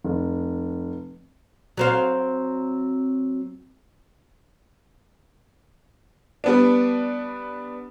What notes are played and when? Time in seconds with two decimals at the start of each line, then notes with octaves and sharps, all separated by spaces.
0.04 F1
1.77 F#3 C4 F5
6.44 G3 B3 D4